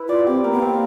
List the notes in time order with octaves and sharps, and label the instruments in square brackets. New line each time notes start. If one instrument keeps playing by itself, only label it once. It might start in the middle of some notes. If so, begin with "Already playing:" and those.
Already playing: [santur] E4 B4
[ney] F4 [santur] D5
[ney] C4 [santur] G4
[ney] A#3 [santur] A#4
[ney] B3
[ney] A#3 [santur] C4